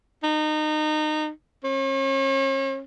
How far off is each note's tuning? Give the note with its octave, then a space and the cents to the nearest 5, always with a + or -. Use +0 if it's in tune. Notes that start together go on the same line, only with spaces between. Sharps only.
D#4 -25
C#4 -40